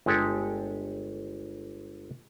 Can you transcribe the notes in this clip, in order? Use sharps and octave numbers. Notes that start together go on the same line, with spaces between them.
G1 G#3 G4 A4